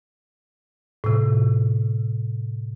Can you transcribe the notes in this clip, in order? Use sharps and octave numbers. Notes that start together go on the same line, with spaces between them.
A2 C3